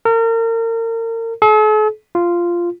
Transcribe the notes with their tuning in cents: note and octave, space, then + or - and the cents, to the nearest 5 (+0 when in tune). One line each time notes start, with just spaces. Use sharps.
A#4 -35
A4 -45
F4 -10